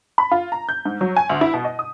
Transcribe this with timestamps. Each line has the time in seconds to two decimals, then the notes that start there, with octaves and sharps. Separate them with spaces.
0.18 B5
0.31 F4
0.52 A#5
0.69 G6
0.85 G#2
1.01 F#3
1.16 G#5
1.29 D2
1.41 E4
1.53 B2
1.65 D#5
1.79 D#6